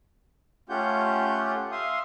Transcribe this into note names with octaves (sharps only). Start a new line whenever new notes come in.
A3 C#4 F4 G4 F#5 G6
E5 F5 C6 D#6